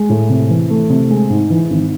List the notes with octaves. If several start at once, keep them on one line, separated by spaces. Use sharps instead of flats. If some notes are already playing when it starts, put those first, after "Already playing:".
Already playing: G#3
A2
C3
E3
A3
C3
G#3
G#2
E3
G#1